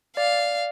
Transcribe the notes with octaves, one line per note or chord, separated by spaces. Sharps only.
D5 F5
D5